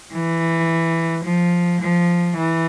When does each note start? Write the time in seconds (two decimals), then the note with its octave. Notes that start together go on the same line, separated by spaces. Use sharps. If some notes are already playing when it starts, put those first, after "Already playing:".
0.13 E3
1.25 F3
1.81 F3
2.37 E3